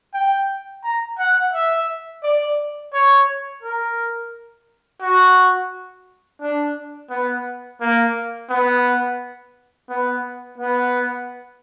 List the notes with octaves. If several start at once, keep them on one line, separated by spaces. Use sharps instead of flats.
G5
A#5
F#5
E5
D5
C#5
A#4
F#4
D4
B3
A#3
B3
B3
B3